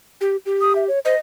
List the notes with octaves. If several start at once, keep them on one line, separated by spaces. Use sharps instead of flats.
G4
G4
D#6
E5
C#5
C5 D#5